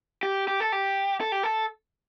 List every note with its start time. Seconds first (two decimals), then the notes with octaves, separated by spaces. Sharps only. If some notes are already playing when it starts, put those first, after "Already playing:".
0.23 G4
0.48 G4
0.60 A4
0.72 G4
1.21 A4
1.32 G4
1.43 A4